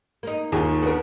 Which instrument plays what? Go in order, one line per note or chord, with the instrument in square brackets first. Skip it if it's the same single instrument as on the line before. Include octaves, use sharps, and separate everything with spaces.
[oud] A#3 D#4
[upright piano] D#2 [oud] F4 G#4
[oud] B3 D4 A#4